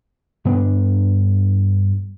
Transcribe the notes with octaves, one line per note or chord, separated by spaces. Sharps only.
G2 B3 D4